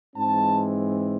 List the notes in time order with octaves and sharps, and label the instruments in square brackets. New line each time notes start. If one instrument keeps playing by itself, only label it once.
[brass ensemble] G#2 E3 G#3 C4 A5